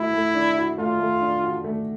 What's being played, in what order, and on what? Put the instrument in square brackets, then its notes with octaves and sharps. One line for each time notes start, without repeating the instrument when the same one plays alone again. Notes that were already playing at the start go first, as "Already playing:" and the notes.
Already playing: [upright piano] A3 F#4 [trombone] E4
[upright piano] A3
D4
F#4
[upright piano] A3 [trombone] F4
[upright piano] A3
D4
F#4
A3